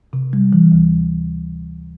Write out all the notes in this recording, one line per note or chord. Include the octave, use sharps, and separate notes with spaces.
C3
G3
E3
D2